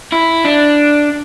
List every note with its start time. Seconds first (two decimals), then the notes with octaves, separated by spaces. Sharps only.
0.12 E4
0.45 D4